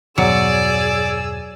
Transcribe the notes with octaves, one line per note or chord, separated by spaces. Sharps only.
E2 G2 B2 F#3 G#4 D5 E6